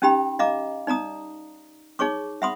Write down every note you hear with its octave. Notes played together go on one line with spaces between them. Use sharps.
C#4 D#4 G4 G5 B5
D#5 F5 A#5 D6
D#4 D5 A#5 D#6
D#4 G#4 C#5 C#6 D6
E5 F#5 B5 C6 D#6